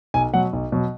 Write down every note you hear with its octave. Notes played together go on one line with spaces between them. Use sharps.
B1 G#5
B2 F#3 F#5
B1
B2 F#3